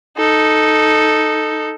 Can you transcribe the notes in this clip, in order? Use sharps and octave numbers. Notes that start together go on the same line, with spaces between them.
D#4 A4